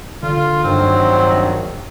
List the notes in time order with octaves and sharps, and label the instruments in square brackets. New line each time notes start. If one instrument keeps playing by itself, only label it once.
[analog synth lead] D3 [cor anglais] F4
[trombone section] A#1 D#3 F#3 [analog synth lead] G2 [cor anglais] C4